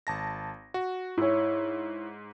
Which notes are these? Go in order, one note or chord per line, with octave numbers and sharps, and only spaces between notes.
G#1 A5 A#6
F#4
G#2 E4 C#5